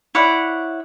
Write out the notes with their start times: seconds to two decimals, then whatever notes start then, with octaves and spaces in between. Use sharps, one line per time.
0.15 E4 C#5 D5 F#5